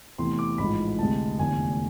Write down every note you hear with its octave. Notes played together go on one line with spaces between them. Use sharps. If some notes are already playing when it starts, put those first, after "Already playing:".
E2 C3 E3 A3 C6
D6
A1 G#2 F3 G#3 B5
D2 C3 G#3 A5
F1 E2 D3 A3 G#5